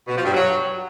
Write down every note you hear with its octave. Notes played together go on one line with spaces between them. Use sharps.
B2
F3
G2
F#3